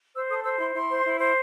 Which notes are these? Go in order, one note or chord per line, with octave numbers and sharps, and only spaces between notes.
C5 E6
A4 D#6
C5 E6
E4 C6
E4 C6
C5
E4
C5